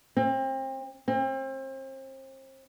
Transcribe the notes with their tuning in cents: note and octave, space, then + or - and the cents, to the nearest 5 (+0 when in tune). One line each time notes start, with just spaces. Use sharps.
C4 +30
C4 +35